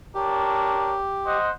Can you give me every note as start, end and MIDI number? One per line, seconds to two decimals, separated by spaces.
0.15 0.96 62
0.15 1.37 67
0.15 0.96 70
0.15 0.96 73
1.25 1.50 72
1.25 1.50 75
1.25 1.50 78